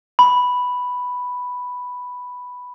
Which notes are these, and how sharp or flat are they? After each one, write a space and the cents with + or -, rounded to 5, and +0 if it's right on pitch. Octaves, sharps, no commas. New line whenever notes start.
B5 +0